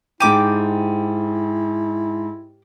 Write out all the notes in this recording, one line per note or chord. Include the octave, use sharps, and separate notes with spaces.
G#2 E4 G4 D6 D#7